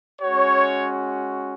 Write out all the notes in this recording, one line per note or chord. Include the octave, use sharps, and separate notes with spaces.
G#3 C#4 F#4 C#5